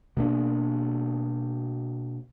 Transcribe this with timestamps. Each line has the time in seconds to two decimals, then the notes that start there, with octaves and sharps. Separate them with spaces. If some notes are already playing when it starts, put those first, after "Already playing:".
0.17 B2 A#3 D4